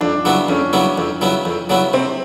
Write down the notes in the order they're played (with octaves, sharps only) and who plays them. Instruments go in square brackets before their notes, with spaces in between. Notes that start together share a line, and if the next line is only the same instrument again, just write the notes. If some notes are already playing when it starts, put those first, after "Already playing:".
[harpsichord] F2 [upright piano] D4
[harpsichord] C#3 F#3 B3 E4
[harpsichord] F2 [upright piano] C#4
[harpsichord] C#3 F#3 B3 E4
F2
C#3 F#3 B3 E4
F2
C#3 F#3 B3 E4
[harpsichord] C3 [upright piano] C4